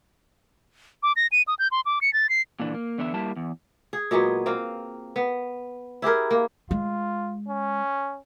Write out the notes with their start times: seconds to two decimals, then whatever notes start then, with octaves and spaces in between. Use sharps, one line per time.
1.03 D6
1.16 A#6
1.32 D#7
1.48 D#6
1.59 G6
1.71 C6
1.86 D6
2.01 C#7
2.13 A6
2.29 C7
2.60 A#2 D3 E3 D4
2.74 A#3
2.98 E2 D3 B3 E5
3.14 G3 A#3 E4 A5
3.36 E2
3.93 G#4
4.11 A#2 F#3 G#3 B3
4.46 A#3 C4 F5
5.16 B3
6.02 E4 G4 G#4 A#4
6.31 A#3
6.71 G#3 F4
7.48 C#4